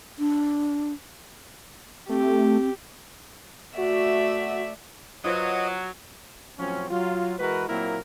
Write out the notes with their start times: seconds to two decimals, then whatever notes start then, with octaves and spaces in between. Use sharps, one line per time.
0.19 D4
2.09 A3 C4 G4
3.78 A3 F#4 D5 E5
5.24 F#3 F4 B4 C5 D#5
6.59 A2 F3 F#3 C4 C#4
6.91 F#3 F4
7.39 E3 G#3 F#4 A#4 B4
7.69 A#2 F#3 A#3 C4 E4 A#4